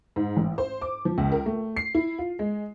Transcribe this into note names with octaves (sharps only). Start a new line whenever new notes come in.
G#2
A1
C5
D6
F3
C#2
A#4
A3
C7
E4
F4
G#3